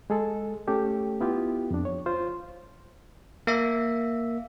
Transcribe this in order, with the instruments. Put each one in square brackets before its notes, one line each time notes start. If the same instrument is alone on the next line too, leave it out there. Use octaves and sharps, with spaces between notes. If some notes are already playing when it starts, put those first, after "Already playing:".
[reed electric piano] G#3 G#4 A4
A3 C#4 G4 A4
B3 E4 F4 G4
F2 D4
C#5
F4 C5
[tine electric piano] A#3 E5